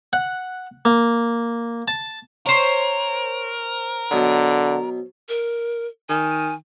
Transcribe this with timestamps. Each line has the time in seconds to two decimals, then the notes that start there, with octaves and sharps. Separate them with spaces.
0.13 F#5
0.85 A#3
1.88 A5
2.46 A#4 C5 C#5
4.12 B2 D3 F#3 D#6
5.29 A#4
6.09 D#3 G#5